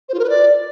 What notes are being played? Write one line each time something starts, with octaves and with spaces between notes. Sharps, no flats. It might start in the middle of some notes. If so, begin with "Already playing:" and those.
C5
F4
A#4
B4
D5